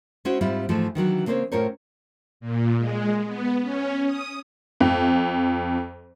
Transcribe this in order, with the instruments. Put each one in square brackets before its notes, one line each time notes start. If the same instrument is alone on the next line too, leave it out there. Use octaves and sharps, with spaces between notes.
[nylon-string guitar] G#3 C#4 E4 F#4 C5
G#2 G3 C4 E4 F4
G#2 E3 F3 G#3 A3
D#3 E3 F#3 D4
C#3 A#3 C4 C5 C#5
A2 C#4 F4 A#4 C5 C#5
[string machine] A#2
G#3
B3
C#4
D#6
[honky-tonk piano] F2